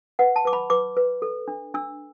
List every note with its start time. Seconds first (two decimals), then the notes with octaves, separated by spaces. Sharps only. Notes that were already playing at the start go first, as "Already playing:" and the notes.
0.19 B4 F#5
0.36 A5
0.45 B4 D6
0.53 B5
0.70 B4 D6
0.97 B4
1.22 A4
1.48 D4
1.74 D4 E6